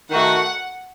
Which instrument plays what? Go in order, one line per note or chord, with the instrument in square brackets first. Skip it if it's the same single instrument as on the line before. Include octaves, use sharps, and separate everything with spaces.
[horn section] D#3 A3 D#4 F#4 [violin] F#5